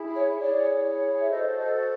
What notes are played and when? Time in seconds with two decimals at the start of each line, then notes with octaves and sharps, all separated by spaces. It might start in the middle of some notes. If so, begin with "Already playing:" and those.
Already playing: E4 G#4
0.16 C#5
0.39 E4 G#4 C#5 D5
1.21 E5
1.28 F#4 A4 C5 D#5
1.58 D#5